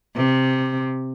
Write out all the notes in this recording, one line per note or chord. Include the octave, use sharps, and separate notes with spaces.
C3